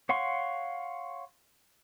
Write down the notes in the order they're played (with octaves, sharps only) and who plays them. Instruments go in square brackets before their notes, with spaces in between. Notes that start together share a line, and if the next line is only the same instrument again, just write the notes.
[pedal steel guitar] C#5 F5 F#5 C6 C#6